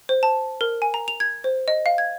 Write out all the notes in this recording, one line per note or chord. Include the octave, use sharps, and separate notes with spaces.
C5
A5
A#4
G#5
A#5
F7
G#6
C5
D#5
F5
G#6